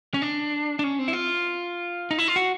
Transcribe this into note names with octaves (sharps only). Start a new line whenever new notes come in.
C#4
D4
D4
C#4
C4
E4
F4
D#4
E4
F4
F#4